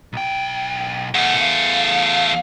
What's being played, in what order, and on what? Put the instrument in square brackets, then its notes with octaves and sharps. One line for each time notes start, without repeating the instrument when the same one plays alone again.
[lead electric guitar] B1 G5
[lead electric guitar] B1 F#5 [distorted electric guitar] E2 A3
[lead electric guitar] F5